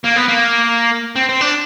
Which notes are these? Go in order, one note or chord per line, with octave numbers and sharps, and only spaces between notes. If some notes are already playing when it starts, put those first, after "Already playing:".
A#3
B3
A#3
C4
C4
D4